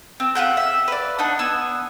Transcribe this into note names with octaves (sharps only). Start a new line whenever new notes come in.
C4
F4 G4 F#5 G6
E5
B4 D5
D4 D#4 F#5
B3 G#5 E6